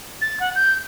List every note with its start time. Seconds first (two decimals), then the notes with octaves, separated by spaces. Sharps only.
0.21 A6
0.40 F#5
0.55 G6